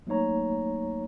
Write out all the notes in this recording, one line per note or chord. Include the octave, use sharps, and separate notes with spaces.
F#3 A3 A#3 D#4 C#5 A#5